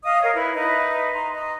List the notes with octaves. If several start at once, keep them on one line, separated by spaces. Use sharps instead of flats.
D#5 F5 D#6
A#4 C#5 D#5 F5
E4 B4
D#4 B4 D#5 E5
A#5 C6
D#5